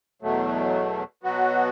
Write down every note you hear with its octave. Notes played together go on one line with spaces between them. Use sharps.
E2 B2 F#3 A3
B2 F#3 B3 F#4